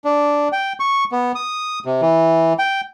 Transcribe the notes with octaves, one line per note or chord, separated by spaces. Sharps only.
D4
G5
C#6
B3
D#6
C3
E3
G5